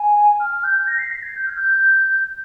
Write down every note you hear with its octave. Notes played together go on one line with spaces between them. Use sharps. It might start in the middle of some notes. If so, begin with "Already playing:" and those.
Already playing: G#5
F6
G6
A#6
C7
A#6
G#6
G6
F6
G6